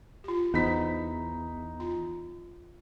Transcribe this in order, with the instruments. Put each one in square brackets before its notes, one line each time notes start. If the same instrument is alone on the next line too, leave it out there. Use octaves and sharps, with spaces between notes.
[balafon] F4 G4
[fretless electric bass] E2 [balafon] B3 C5 [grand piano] D#4 B5 B6
[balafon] F4